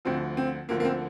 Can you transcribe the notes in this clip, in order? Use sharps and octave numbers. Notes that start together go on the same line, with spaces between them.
D2 D3 F3 C4
C4
D2 D3 F3 A#3
A#3
C4